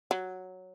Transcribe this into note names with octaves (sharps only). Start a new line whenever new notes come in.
F#3